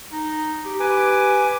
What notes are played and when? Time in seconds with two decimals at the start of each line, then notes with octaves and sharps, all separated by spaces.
0.13 D#4
0.65 G4
0.80 B4 G#5 D6